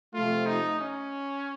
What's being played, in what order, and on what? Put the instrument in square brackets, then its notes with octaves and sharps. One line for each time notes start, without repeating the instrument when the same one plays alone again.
[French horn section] C3 F3 A3 [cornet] F4
[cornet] D#4
C#4